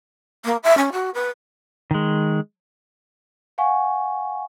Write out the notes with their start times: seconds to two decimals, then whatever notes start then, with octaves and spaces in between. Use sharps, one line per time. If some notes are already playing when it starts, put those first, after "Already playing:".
0.45 A#3
0.63 E5
0.77 C#4
0.92 F#4
1.14 B4
1.91 D#3 G#3
3.58 F5 F#5 G#5 C#6